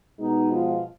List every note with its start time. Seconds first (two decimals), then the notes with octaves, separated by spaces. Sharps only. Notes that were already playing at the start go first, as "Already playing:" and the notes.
0.19 B2 G#3 B3 D#4
0.51 F3 F4